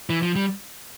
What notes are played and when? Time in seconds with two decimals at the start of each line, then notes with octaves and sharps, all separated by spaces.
0.10 E3
0.22 F3
0.36 G3